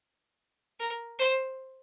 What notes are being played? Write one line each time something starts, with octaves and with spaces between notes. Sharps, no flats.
A#4
C5